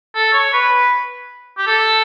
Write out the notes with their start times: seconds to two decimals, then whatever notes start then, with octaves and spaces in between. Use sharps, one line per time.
0.14 A4
0.32 C#5
0.53 B4
1.57 G4
1.67 A4